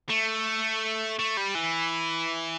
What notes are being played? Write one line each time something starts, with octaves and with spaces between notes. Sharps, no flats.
A3
A3
G3
E3